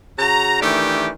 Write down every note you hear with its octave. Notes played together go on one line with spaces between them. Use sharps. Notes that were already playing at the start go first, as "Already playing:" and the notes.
C#3 F#4 A#5
D#3 E3 A3 D4 G4